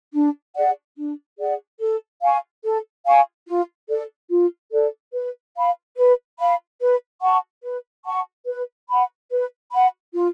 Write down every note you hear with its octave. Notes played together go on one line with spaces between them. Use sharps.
D4
G#4 D5 F#5
D4
G#4 D5 F#5
A4
F5 G#5 C#6
A4
F5 G#5 C#6
F4
A4 D5
F4
A4 D5
B4
F5 B5
B4
F5 B5
B4
F#5 A5 C#6
B4
F#5 A5 C#6
B4
F#5 B5
B4
F#5 B5
F4